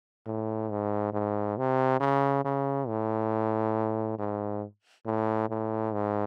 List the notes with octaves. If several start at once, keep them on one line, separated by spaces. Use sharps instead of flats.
A2
G#2
G#2
C3
C#3
C#3
A2
G#2
A2
A2
G#2